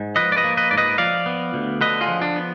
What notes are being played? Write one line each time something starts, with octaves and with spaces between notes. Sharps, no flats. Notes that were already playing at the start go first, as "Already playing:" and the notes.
Already playing: G#2
F3 B4 D#5
D5
B4 D#5
A#3
B4 D#5
G#2 D5
B4 D#5
F3 D5 F5
B3
D2
D3 B4 D#5
F4 G#4
F3
D4
B3